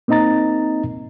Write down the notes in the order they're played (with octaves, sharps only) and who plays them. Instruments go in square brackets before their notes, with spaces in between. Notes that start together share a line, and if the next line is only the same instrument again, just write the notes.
[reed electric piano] A#3 C4 D#4 D#5 A#5 A6